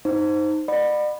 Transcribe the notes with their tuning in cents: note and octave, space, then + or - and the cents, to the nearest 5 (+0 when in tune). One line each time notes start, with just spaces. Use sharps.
D#4 +0 C5 +0
D5 +40 F#5 -10 B5 +0